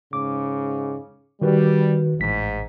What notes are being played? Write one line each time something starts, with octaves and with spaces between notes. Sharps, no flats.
G#2 C#3 D6
D#3 G3 F#4 B4
A1 G#2 B6